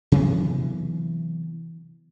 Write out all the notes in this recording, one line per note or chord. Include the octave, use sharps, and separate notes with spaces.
C3 E3 F#3 B3